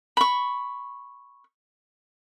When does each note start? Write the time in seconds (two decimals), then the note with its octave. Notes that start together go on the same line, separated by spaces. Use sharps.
0.17 B5 C#6